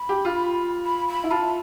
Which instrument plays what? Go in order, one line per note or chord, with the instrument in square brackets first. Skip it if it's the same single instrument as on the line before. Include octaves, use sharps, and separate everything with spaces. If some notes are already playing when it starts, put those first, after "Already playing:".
Already playing: [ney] B5
[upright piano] G4
F4
[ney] B5
B5
[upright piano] E4
[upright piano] F4 [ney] A5